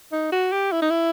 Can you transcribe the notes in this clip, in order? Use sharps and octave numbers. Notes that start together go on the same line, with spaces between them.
D#4
F#4
G4
E4
D#4
E4